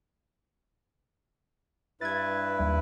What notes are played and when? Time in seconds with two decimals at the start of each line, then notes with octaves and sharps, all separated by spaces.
2.01 G2 E4 B4 G#6 A6
2.58 D#2 G3 E5